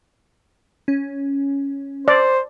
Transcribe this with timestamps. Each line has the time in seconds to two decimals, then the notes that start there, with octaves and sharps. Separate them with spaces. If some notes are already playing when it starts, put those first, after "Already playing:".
0.88 C#4
2.08 C5 D5